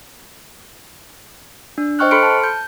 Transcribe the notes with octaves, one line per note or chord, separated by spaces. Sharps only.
D4
C5 D#5 G5 C#6 F6 F#6
A4 B5 C6 F6 C#7 D7
A5
G6